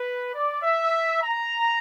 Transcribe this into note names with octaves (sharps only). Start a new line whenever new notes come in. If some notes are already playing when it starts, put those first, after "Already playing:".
Already playing: B4
D5
E5
A#5